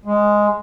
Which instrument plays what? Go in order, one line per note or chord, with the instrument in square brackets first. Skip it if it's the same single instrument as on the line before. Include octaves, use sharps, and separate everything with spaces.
[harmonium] G#3